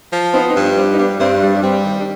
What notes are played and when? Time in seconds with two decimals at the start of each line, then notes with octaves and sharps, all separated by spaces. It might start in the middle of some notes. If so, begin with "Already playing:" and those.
0.12 F3
0.33 B3 C4 D#4
0.43 F4
0.47 C4 D#4
0.56 G2
0.62 B3 D4
0.77 G3 C4
0.93 D#4
0.98 G2 B3 D4
1.19 G2 C4
1.41 G3
1.54 D4
1.62 G3 C4
1.84 D#3
2.00 D4